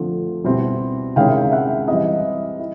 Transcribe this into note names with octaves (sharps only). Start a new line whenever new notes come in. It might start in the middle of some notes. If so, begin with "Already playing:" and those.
Already playing: D3 F3 A3 C4
B2 G3 C4 E4
C3 D#3 G#3 C#4 E4 F5 G5
E5 F#5
E3 G3 C4 E4 D#5 F5
E4